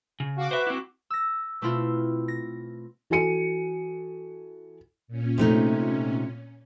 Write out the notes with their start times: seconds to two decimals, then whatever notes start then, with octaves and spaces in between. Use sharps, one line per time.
0.20 C#3
0.37 F#4 F5 D6
0.51 B4 C5 E5
0.67 C4 E4
1.10 E6 A#6
1.62 B2 A3 C4 E4 F4 A4
2.28 A#6
3.10 E3 F#4 A4 G#5 C#7 D#7
5.08 A#2 C#4
5.38 C3 A3 D#4